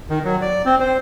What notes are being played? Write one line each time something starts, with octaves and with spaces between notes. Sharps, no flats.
D#3
F#3
D5
C4
C5